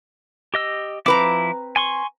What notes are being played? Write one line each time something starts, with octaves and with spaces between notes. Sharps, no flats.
G4 D#5 E6
F3 C4 E4 B4 A#5 D6
G#5 C6 C#6